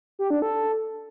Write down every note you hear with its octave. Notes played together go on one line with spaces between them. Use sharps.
G4
D4
A4